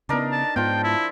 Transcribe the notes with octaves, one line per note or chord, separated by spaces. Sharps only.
C#3 B3 D4 D#4 A#4
A5
G#2 F3 B3 F4 G5
E4